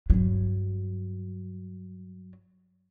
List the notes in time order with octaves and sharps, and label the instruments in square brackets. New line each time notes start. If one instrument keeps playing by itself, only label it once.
[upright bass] G2 F#3